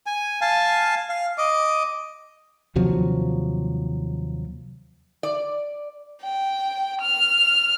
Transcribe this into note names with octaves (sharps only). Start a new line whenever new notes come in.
G#5
F5 G#5 A5
F5
D#5 D6
D#2 C3 F3 F#3
D5
G5
F6